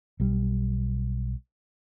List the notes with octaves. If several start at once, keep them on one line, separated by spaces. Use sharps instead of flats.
B1 G3